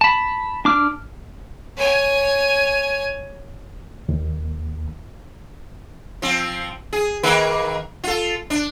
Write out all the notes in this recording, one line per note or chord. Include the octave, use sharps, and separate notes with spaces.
A5 B5
D4 D6 F6
C#5 G#5
D#2
F3 C4
G#4
D#3 A#3 B4
F4 A4
D4